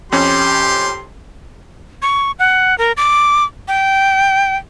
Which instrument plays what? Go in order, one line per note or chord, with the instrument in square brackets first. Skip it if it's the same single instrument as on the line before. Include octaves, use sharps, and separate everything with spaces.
[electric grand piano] F2 C#4 [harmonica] G4 C6
[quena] C#6
F#5
A#4
D6
G5